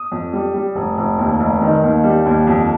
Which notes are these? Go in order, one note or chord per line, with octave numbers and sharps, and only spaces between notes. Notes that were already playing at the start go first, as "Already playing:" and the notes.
Already playing: D#6
F2
G3
G3
F1
F1
D#2
F1
D#3
D#2
G3
D#2
F2